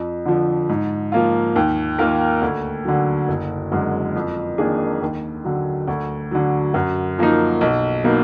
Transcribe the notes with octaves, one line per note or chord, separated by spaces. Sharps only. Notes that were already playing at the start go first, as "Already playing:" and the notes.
Already playing: F2
D3 F3
G#2
F3 A#3 F4
D#2
D#3 A#3 F4 A#4
D2
D3 F#3
F#1
F#2 D3 G#3
F2
D#3 A#3 D4 G#4
D#2
D3 F#3
D2
D3 F#3
F#2
F3 A#3 D#4
B1
B2 F#3 A#3 D#4